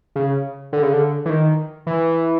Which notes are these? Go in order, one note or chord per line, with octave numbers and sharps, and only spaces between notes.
C#3
D3
C#3
D3
E3
D#3
E3